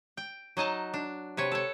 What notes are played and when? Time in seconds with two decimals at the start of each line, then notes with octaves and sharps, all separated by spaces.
0.17 G5
0.57 F#3 D#4 D#5 A5
0.94 D4
1.37 C3 B4 C#5
1.52 A4 C#5